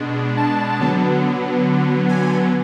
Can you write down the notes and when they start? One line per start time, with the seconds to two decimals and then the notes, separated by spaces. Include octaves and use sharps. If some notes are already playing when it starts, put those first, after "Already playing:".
Already playing: B2 G#3 D4
0.37 A5
0.80 D3 F#3 B3
2.09 G#5